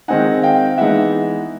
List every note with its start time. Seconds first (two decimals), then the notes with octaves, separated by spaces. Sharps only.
0.08 D#3 G#3 C4 D#4 F#5 G#5
0.43 F5 G5
0.78 E3 G#3 B3 D#4 E5 F#5